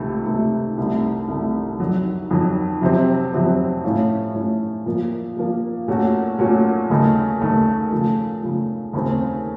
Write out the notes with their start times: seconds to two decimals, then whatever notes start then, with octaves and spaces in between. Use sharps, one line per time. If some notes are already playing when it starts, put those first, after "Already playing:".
Already playing: C#2 C3 D#3 A3
0.26 C#2 C3 D#3 A3
0.77 C2 C3 D#3 A3
1.28 C2 C3 D#3 A3
1.79 F2 D#3 F#3
2.31 F2 D#3 F#3
2.82 F2 C3 F#3 C4
3.33 F2 C3 F#3 C4
3.84 A2 A3 C#4 F4
4.34 A2 A3 C#4 F4
4.86 A#2 F3 A#3
5.37 A#2 F3 A#3
5.88 A#2 A3 C#4 F#4
6.39 A#2 A3 C#4 F#4
6.90 D#2 C#3 A3 D#4
7.41 D#2 C#3 A3 D#4
7.92 C#3 F3 A3
8.42 C#3 F3 A3
8.93 D#2 C#3 A3 C4